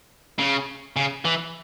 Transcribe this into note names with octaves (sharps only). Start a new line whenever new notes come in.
C#3
C#3
E3